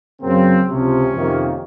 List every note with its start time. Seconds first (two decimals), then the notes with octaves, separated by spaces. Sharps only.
0.21 F#2 C#3 F#3 A#3 C4
0.67 C#2 C3 F3 C#4
1.13 F2 C3 D#3 A#3